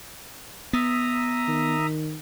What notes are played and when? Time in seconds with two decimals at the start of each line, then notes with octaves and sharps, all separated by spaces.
0.73 B3 E5 A#5 D#6
1.48 D#3